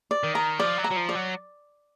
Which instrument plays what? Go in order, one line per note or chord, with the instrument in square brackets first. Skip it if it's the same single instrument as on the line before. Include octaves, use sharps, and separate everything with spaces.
[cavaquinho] D5
[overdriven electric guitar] D#3
[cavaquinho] A#5
[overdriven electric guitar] F3 [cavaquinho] D5
[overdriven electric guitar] F#3
[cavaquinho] A#5
[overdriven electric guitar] F#3
F3
[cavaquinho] D5
[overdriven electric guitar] F#3